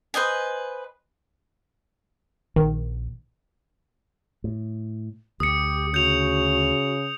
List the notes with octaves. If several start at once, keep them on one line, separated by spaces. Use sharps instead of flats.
B4 C5 D#5 G#5
A#1 D#3
A2
D2 G4 D#6 C#7
C#3 F#4 G6 F7